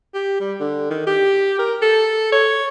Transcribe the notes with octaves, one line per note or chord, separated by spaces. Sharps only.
G4
G3
D3
D#3
G4
A#4
A4
C#5